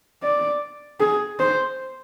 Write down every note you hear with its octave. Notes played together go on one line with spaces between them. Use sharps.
D5
G#4
C5